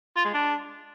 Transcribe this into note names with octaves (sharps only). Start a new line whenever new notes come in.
F4
G#3
D4